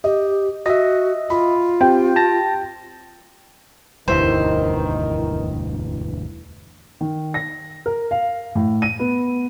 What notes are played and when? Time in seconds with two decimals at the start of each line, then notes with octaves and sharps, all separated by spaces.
0.04 G4 D#5
0.66 F#4 D#5 E5 A#6
1.30 F4 B5
1.81 C4 G4 G5
2.16 A5 A6 A#6
4.08 E1 D2 G2 D#3 G3 E4 B4 C5
7.01 D#3
7.34 A#6
7.86 A#4
8.11 F5
8.55 A2
8.82 D#7
8.99 B3